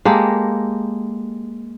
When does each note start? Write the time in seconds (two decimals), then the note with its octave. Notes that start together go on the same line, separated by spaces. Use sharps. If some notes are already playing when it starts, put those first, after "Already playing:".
0.05 G#3 A#3 G4 A4